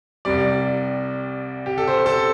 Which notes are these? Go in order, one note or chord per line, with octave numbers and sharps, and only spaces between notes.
C2 C3 G3 D5
G4
A4
C5
C5
A4